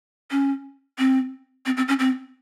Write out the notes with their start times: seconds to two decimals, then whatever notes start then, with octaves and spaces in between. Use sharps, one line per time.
0.31 C#4
0.98 C4
1.66 C4
1.77 C4
1.88 C#4
1.99 C4